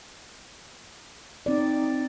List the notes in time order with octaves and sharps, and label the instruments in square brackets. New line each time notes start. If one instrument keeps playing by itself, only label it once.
[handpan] C4 D5 [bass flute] D#4